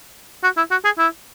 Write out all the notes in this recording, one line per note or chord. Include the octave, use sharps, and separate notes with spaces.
F#4
E4
F#4
G#4
E4